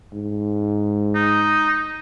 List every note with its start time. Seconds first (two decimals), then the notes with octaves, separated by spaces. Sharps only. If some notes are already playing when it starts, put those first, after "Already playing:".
0.13 G#2
1.15 D#4